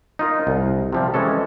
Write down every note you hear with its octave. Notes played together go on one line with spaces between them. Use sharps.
D#4 F4 A#4
C2
C3 F3 G3
E3 G#3 C#4 A4